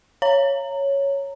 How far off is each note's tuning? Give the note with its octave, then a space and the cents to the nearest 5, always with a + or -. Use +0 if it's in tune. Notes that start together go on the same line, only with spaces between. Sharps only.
C#5 +0 A#5 -20